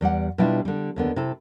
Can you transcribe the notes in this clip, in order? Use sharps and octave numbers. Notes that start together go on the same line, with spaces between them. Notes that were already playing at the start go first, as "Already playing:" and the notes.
E2 G3 D5 F#5
B2 G3 D4 E4 F4
D3 G3
D#2 D3 B3
C3 E4 A4